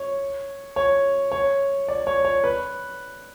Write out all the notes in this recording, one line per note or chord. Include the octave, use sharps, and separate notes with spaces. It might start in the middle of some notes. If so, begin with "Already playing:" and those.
Already playing: C#5
C#5
C#5
D5
C#5
C#5
B4